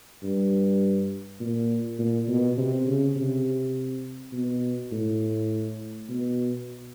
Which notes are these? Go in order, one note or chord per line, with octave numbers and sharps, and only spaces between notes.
G2
A#2
A#2
B2
C3
C#3
C3
B2
A2
B2